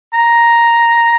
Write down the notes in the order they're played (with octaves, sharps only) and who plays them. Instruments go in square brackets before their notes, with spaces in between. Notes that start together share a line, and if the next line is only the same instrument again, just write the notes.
[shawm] A#5